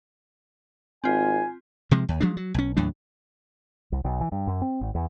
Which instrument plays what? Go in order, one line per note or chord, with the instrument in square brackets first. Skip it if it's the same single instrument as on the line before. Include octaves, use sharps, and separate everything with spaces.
[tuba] G#1 [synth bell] C4 F4 [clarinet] G#5
[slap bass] C3 F3 G#3
D#2
F3 F#3 G#3 D4
F#3
B1 C#4
D#2 A2 F#3 D4
[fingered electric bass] C2
B1
E3
G2
F#2
C4
G#1
E2